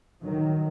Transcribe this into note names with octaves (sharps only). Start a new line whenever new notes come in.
D#3 F#3